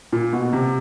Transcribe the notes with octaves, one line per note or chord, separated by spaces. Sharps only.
A#2
B2
C3